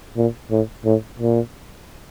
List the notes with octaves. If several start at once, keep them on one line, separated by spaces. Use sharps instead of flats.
A#2
A2
A2
A#2